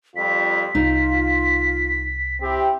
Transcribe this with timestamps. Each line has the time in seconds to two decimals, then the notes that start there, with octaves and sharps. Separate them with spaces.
0.16 F2 G3 F4 B6
0.75 C2 D#4 F4
2.41 C4 E4 G4